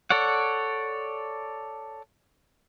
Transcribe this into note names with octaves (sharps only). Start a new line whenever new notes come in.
A4 C#5 D5 F#5